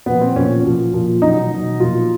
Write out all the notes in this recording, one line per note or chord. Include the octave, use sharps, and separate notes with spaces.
A#2 F3 B3
C4
A#2 F3 C#4
A#2 F3
A#2 F3
B2 F#3 D#4
B2 F#3
A#2 F3 F4